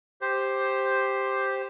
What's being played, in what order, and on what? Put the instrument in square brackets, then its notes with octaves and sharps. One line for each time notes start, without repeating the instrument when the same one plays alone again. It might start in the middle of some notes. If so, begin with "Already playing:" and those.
[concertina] G4 C5